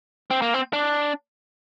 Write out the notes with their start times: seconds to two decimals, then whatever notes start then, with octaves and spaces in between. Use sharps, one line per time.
0.30 C4
0.42 A#3
0.54 C4
0.73 D4